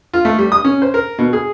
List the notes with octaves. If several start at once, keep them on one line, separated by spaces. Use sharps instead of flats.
F4
A3
G3
D#6
C#4
C5
A#4
B2
G#4